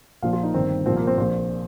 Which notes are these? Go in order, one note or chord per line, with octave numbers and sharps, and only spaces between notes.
A#1 A#2 F3 F5
F4
D#4
G1 G2 D#3 C4
C2 A#2 F3 C4
A#3
C4
A#1 A#2 F3 C5